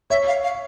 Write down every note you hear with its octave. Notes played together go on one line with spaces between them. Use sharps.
C#5 E5
F5
F5